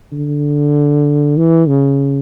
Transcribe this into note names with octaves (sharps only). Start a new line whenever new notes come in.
D3
E3
C#3